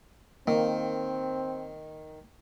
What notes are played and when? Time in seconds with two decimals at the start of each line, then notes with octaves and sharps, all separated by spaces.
0.47 D#3 A#3 C4